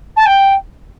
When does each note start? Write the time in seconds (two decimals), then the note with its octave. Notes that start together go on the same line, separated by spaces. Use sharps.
0.16 A5
0.25 G5